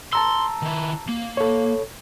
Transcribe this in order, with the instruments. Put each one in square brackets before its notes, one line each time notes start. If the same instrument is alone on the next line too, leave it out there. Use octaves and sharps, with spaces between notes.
[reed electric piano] A5 A#5 E6 [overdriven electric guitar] C6
[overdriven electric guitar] D#3 E4
A#3
[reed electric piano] A4 C#5